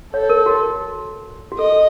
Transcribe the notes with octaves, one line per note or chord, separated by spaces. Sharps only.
A4 C#5
A#4
F#4
F#4
A4 D#5